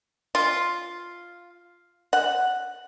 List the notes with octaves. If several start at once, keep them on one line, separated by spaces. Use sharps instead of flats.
F4
F#5